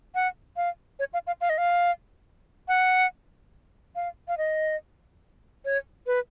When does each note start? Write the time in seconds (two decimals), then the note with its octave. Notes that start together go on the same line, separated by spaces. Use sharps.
0.15 F#5
0.57 F5
0.99 C#5
1.13 F5
1.27 F5
1.41 F5
1.50 D#5
1.58 F5
2.68 F#5
3.96 F5
4.28 F5
4.38 D#5
5.65 C#5
6.07 B4